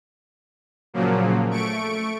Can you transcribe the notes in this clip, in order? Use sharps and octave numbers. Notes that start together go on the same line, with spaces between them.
A#2 C#3 F3 F#3 A#3
A3 C#6 D7